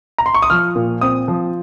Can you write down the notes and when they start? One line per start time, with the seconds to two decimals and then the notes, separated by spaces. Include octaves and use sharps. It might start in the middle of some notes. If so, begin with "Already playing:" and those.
0.18 A#5
0.26 C6
0.34 C#6
0.42 D#6
0.50 F3 F6
0.75 A#2
1.01 C4 D#6
1.28 F3